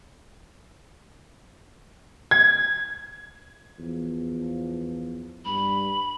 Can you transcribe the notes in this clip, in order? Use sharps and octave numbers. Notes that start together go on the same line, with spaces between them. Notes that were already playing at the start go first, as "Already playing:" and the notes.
G#6
E2 F3
G2 B5